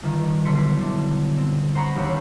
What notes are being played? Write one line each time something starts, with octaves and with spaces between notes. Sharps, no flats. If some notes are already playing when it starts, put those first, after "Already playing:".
G1 D#3
B1 D3 E3 C6 B6 C#7
D4
C4
C5 F#5 A#5 B5 C#6
E1 D#2 G4 C#5 F#6